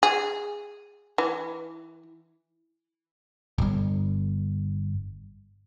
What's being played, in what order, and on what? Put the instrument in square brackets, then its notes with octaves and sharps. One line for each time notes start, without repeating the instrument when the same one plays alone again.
[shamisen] G#4
E3
[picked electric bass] D1 G1